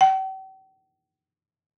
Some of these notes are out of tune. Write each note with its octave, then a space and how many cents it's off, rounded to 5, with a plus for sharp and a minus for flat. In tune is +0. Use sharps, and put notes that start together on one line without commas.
G5 -45